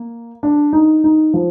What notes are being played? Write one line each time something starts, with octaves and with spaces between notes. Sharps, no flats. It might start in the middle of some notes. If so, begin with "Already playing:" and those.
Already playing: A#3
D4
D#4
D#4
F3